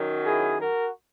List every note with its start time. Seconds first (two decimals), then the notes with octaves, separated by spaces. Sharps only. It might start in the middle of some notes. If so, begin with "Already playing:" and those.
Already playing: F#2 D#3 F#3
0.26 E4 G#4
0.60 F#4 A#4